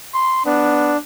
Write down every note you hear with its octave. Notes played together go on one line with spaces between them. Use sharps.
C6
B3 D4